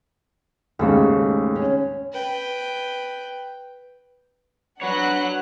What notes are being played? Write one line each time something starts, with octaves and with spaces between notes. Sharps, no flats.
D#2 G#2 C#3 A3 A4
C#4
B4 G5
D4 F#4 B4 C#5 F#5 F#6